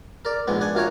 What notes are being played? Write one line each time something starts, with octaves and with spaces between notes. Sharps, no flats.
A#4 D5
A#1 G#2 G#3 B3
D4 F#5 G#5
F#2 F4 A#4 C#5 F#5